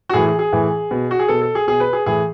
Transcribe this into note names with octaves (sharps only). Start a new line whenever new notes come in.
F#4
A2 E3 G#4
G#4
G#4
A2 E3
B2
F#4
G#4
B2 A4
A4
G#4
B2 G#4
B4
G#4
A2 E3 G#4